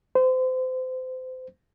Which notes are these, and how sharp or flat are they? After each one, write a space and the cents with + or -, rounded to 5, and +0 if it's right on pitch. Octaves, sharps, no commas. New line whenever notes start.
C5 -30